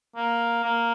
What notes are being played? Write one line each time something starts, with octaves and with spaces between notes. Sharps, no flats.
A#3
A#3